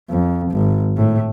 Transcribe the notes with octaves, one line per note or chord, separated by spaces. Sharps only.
F2
G#1
A2